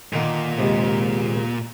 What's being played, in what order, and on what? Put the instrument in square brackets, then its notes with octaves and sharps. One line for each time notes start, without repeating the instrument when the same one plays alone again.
[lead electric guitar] A#2 [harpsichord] D3 D#3 A#3
[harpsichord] D#2 G#2 C3